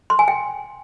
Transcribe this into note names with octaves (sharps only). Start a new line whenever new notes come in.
C6
G#5
G5